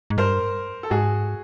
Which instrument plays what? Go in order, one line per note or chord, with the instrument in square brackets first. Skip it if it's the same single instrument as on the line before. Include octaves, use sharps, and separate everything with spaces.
[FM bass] G#2
[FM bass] G2 [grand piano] A#4 C5
[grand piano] A4
[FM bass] G#2 [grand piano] F#4 G#4